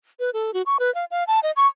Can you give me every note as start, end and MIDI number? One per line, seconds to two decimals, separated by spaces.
0.20 0.30 71
0.33 0.54 69
0.54 0.62 66
0.66 0.77 85
0.80 0.93 71
0.95 1.05 77
1.11 1.24 77
1.27 1.40 81
1.43 1.51 75
1.56 1.67 85